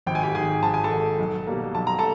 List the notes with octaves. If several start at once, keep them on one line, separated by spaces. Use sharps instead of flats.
G#1 G5
G#5
G4 G5
G#2 D#3 G#4 G#5
G#1 A5
G#5
A4 A5
G#2 D#3
B1
B2 G3 A#3
B1 A5
A#5
A4 A5